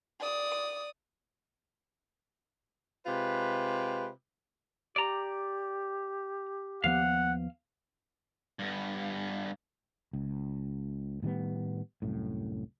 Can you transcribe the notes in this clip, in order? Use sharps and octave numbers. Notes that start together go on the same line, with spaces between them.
D5 D#6
C3 G#3 F4 B4
G4 D5 A#5
D#2 F3 B3 F5 F#5
G2 B3
C#2
A2 D#3 G3 B3
C2 F#2 A2